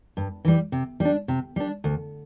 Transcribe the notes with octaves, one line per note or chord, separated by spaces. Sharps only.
G2
E3 G3
C3
G3 D4
C3
G3 D4
D2